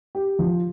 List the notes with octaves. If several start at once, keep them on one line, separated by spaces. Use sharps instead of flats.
G4
F3